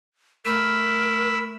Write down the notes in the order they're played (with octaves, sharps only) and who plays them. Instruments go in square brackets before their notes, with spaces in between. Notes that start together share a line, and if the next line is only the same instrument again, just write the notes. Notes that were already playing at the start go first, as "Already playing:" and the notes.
[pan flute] A3 [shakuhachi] A#4 [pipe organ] B5 E6